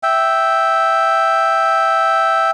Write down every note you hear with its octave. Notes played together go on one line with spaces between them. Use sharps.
E5 G5